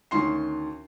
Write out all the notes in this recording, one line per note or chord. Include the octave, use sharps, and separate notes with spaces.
D2 D#3 C#4 C6 C7